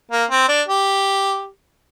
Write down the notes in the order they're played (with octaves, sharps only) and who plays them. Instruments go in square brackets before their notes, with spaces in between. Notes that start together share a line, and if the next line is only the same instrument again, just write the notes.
[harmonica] A#3
C4
D4
G4